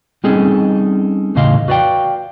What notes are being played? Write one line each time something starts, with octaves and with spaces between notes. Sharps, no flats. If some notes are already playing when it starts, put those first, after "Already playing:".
G3 C4 C#4 D#4 G#4 A4
E2 A2 C#3 D#5 F5 C6
F#4 B4 D5 F5 G5